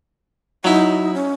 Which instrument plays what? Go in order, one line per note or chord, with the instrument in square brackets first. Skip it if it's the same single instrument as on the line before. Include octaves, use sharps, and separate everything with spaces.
[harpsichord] F#3 E4 [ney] D#4
[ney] C#4